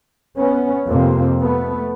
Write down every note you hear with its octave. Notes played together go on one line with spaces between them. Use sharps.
B3 C#4
F2 C3 A#3 C4
A3 B3